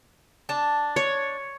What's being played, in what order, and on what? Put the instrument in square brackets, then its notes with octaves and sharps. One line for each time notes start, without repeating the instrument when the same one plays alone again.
[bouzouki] D4 A5
[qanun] C#5